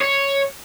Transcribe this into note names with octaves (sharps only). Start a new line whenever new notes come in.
C#5